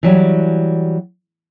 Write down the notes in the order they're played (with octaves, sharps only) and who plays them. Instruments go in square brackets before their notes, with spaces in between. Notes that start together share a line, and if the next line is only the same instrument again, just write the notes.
[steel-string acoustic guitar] E3 F#3 G3